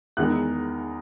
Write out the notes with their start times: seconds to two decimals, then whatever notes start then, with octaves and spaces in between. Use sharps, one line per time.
0.17 E2 D#3 G#3 D#4 F#6